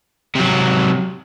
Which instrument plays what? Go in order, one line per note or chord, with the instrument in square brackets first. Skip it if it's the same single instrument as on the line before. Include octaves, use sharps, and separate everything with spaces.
[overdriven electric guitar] C3 F#3